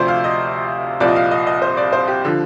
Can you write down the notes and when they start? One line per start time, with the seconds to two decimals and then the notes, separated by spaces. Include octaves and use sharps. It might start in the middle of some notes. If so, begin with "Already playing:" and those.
Already playing: D2 C3 F3 C5 D5
0.08 F5
0.24 D#5
1.00 C2 A#2 F3 D5
1.08 D#5
1.16 F5
1.31 D#5
1.47 D#5
1.62 C5
1.77 D5
1.93 C5
2.08 G4
2.25 D3 F3